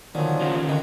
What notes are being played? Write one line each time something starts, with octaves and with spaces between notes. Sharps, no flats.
A#2 D3 D#3 F3 F#3
D#2 C#3 F4
D3 D#3